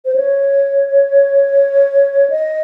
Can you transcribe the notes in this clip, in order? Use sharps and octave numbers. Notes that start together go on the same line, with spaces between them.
C5
C#5
D#5